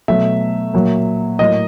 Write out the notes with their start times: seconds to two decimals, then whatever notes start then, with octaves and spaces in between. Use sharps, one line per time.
0.08 B2 F#3 A3 E5
0.73 A#2 F#3 A#3
1.39 A2 F#3 A#3 D#5